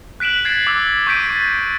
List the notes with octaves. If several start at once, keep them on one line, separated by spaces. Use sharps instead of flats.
F#6 B6 D7 E7 F#7
F#6 G#6 A6 C7 D7
D6 E6 F#6 F#7
C#6 D6 G6 B6 D7 D#7
A6